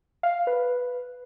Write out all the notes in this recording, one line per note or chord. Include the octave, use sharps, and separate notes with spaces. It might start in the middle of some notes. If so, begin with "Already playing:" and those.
F5
B4